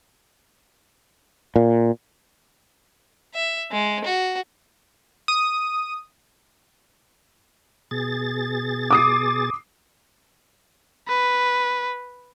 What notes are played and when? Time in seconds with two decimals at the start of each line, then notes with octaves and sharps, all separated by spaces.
1.56 A#2
3.35 E5
3.72 G#3
4.05 F#4
5.28 D#6
7.91 B2 G#4 A6
8.91 D6 D#6 C7
11.08 B4